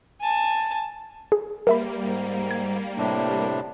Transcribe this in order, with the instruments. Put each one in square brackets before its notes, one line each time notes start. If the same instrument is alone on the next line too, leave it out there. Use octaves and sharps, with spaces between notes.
[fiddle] G#5 A5
[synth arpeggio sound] G#4
[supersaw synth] G3 A#3 [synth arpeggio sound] A#4 E5 B5
[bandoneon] G#2
[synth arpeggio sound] G#6
[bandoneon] A2 C3 D4